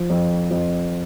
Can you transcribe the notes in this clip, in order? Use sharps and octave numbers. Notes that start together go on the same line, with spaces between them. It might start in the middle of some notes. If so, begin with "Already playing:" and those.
Already playing: F3
F2
F2